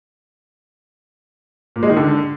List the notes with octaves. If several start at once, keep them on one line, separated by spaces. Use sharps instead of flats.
A#2
G#3
D#3
D3